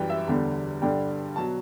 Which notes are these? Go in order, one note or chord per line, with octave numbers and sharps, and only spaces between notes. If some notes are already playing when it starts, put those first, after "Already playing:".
Already playing: F#2 E3 G3 G5
E5
E2 D3 G3
G2 D3 G3 G5
B2 F#3 A5